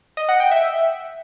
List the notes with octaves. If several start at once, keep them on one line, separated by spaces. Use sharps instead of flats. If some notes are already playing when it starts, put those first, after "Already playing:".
D#5
F#5
G5
E5